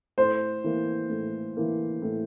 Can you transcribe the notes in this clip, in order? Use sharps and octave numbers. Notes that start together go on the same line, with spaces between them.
A2 C5
E3 A#3
A2
E3 A#3
A2